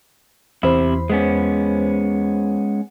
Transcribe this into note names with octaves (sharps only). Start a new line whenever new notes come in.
E2 C3 E4 C5 B5
G#3 B3 C#4